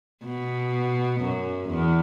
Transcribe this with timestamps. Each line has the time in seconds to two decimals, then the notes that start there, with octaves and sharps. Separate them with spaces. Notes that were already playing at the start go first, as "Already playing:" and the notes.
0.25 B2
1.21 F#2
1.69 E2